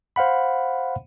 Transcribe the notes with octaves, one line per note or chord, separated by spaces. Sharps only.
C5 F5 F#5 B5